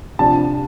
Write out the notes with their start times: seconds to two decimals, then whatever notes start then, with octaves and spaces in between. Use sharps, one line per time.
0.19 C3 F3 D4 A5